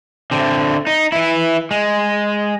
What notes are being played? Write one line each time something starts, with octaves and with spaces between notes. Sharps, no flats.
D3 C4
D#4
E3 E4
G#3